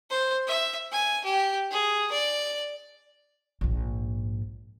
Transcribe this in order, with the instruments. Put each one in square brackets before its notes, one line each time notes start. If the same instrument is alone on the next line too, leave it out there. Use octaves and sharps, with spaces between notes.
[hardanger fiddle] C5
E5
G#5
G4
G#4
D5
[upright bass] A#1 G#2